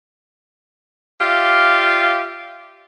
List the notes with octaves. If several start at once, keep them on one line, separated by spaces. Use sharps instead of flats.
F4 G4 D5 E5 F5